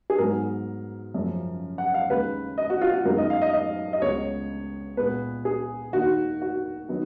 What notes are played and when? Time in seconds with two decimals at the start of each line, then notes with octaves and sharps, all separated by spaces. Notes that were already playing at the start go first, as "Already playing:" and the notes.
0.10 G#4
0.18 G#2 F#3 B3 A#4
1.14 F#2 C#3 F3
1.78 F#5
1.94 F5
2.10 D#2 C#3 G#3 B4
2.58 D#5
2.70 F#4
2.81 F4
2.94 F#4
3.05 F#2 D#3 G#3 B3 A#4
3.18 D#5
3.30 F5
3.42 D#5
3.53 D#5
3.93 D#5
4.01 C#2 C#3 G#3 B3 C#5
4.97 A#2 G#3 B3 B4
5.45 G#4
5.93 D#2 D#3 A#3 F#4
6.42 F#4
6.89 D#3 F#3 B3